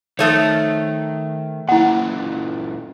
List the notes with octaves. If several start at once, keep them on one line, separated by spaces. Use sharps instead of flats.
D#3 F3 A3 C#5
A#2 E3 E4 F#5